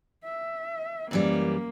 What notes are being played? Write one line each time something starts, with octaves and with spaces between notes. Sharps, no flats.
E5
F#2 E3 G3 A#3